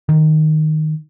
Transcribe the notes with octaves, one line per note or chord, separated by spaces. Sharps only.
D#3